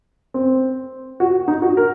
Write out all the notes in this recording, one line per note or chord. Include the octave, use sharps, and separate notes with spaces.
C4
F#4
D#4
F#4
A#4